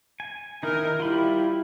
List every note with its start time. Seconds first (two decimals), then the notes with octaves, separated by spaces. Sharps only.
0.20 G#5
0.63 D#3 D#4 E4 A#4
1.00 G3 E4 F4 B5